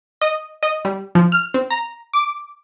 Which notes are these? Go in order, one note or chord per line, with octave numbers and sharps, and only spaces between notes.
D#5
D#5
G3
F3
F6
C4
A#5
D6